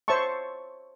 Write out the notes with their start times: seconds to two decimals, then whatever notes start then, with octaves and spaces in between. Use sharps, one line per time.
0.08 C5 C#5 E5 A5 C#6